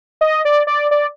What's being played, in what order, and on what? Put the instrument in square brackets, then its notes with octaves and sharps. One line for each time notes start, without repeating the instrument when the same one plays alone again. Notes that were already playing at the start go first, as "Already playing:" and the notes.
[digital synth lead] D#5
D5
D5
D5